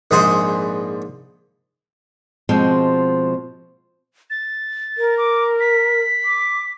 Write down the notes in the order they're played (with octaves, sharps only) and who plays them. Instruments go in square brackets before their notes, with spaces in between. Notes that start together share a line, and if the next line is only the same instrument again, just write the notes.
[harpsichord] A#1 G#2 G#4 C5 F#5
[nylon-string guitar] B2 F3 G#3 C4
[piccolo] A6
[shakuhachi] A#4
[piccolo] D6
B6
[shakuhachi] D6